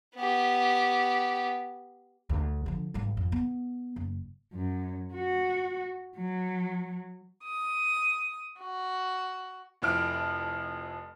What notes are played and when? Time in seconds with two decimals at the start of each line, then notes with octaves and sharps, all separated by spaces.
0.16 B3 G4
2.29 D2
2.66 D3 F3
2.94 G#1 G3
3.17 F2
3.32 B3
3.96 F#1
4.54 F#2
5.14 F#4
6.17 F#3
7.45 D#6
8.58 F#4
9.82 F1 F2 F3 E4 F6 D7